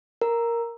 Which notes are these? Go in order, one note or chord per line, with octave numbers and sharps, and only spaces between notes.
A#4